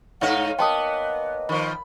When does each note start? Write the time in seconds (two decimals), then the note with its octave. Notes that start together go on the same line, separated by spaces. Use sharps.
0.21 G#2 D#4 F5 F#5 A#5 C#6
0.59 A#3 B3 C#5 D#5 G5 A5 C6 D#6
1.49 D#3 F3 B5